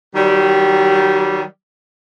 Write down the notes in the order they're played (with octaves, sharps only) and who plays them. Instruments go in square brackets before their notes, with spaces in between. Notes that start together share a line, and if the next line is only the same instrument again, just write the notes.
[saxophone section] D#3 F#3 G3